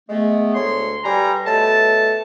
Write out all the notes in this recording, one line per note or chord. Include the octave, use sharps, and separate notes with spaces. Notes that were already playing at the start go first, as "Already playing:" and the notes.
G#3 A3 B3
D2 C#5 C6
G3 B4 G#5 A#5
B2 A3 C#5 A5